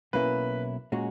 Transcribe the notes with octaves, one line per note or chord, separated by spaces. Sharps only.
B1 B2 A#3 C#4 E4 B4
A#2 G#3 C#4 F#4